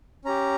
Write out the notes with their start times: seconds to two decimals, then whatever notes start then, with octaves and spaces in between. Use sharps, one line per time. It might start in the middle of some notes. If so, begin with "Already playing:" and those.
0.25 C#4 G4 A#5